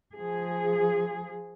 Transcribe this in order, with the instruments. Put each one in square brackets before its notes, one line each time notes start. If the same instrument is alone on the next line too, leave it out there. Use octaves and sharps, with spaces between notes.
[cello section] F3 G#4